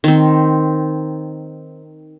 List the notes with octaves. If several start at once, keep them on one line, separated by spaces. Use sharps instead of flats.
D#3 C4